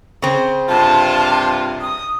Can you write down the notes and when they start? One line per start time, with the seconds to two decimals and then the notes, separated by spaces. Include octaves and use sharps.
0.22 C#3 C4
0.69 G2 C3 F4 A5
1.81 D#6